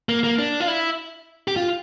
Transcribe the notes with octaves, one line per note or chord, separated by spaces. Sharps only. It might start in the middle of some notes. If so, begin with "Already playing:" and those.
A#3
A#3
D4
F4
E4
G4
F4